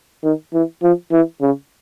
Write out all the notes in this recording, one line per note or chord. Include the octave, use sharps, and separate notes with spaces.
D#3
E3
F3
E3
C#3